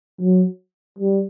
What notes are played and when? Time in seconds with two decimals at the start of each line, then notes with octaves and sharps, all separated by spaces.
0.21 F#3
0.99 G3